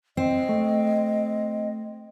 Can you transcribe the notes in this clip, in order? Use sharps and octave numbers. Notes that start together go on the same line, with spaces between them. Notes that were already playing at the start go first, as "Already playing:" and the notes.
C4 D#5
A3